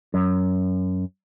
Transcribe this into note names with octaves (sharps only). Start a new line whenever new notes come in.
F#2